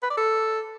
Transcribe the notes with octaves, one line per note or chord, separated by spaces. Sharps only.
B4
D5
A4